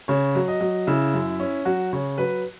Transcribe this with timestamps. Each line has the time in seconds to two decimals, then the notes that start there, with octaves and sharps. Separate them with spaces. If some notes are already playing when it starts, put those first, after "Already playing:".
0.08 C#3 C#5
0.35 F#3
0.48 D#5
0.61 F#3
0.87 C#3 E4
1.14 F#2
1.40 C#4
1.65 F#3 F#4
1.93 C#3 C#5
2.18 F#3 B4